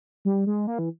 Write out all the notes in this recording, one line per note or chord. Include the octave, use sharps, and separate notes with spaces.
G3
G#3
A#3
E3